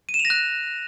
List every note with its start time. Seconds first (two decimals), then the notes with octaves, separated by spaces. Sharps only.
0.09 D#7
0.14 E7
0.19 F7
0.25 A#6
0.30 F#6